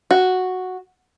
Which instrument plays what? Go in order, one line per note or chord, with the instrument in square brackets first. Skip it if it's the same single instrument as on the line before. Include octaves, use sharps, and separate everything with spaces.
[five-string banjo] F#4